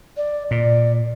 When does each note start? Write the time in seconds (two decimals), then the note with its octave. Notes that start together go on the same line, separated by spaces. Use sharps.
0.17 D5
0.51 A#2 D5